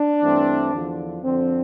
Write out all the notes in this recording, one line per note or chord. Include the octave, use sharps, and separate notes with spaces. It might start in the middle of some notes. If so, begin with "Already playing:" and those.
Already playing: D4
G2 E3 A3 C4
E2 D3 F3
F2 D3 F3 C4